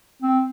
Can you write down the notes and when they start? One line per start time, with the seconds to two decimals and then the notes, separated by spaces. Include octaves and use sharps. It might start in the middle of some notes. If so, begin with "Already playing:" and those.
0.22 C4